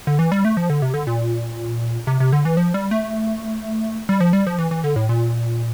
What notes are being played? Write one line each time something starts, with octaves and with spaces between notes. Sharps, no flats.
D3
E3
G3
A3
F3
D3
C3
D3
A#2
C3
C3
D3
E3
F3
G3
A3
G3
F3
G3
F3
E3
E3
D3
A2
A#2